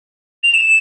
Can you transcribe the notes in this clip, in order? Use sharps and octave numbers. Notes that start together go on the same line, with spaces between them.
F7
E7